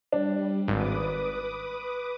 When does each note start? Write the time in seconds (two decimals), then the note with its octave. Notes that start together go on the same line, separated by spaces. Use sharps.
0.12 G3 D4
0.68 G#1 B4 D6 D#6